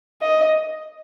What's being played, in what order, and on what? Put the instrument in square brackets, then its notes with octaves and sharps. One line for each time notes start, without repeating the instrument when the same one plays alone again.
[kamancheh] D#5